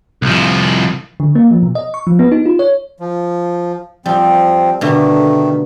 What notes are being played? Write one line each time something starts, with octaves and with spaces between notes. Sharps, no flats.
C2 F3
D3
A#3
F3
B2
D#5
C#6
F3
B3
D#4
F4
C#5
F3
F3 G3 C4
B2 D3 D#3 A3